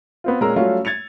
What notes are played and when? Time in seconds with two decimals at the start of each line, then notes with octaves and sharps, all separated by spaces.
0.24 B3 C4 F4
0.41 A#2 G#3 C#4 A#4 A#5 E6
0.56 F#3 G3 A3 C#4 F4 F#4
0.85 G#6 A6 C#7 F7